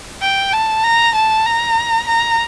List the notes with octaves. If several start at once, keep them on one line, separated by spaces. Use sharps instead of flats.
G5
A5
A#5
A5
A#5
A#5